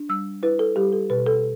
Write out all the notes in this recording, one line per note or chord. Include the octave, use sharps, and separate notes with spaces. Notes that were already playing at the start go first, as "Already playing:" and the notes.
Already playing: D4
G3 E6
E4 B4
A4
G3 G4
A4
B2 B4
A4